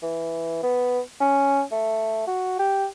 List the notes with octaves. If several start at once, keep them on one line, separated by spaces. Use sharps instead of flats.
E3
B3
C#4
A3
F#4
G4